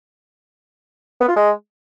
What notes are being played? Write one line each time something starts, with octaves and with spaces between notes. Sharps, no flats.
B3
F4
G#3